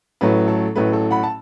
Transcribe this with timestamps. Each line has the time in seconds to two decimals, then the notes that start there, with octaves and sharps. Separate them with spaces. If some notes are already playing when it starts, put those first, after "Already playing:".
0.21 A1 A2 F#3 A3 B4
0.48 A4
0.75 A1 A2 F#3 A3 B4
0.93 A4
1.11 F#5 B5
1.23 A5